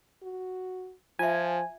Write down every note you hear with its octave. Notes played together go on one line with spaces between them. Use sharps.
F#4
F3 F4 E5 G#5